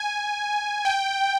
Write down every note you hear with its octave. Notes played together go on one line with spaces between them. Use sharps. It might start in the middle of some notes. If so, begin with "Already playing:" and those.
Already playing: G#5
G5